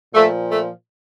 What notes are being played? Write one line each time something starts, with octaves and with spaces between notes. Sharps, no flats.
A#2 F3 A3
A3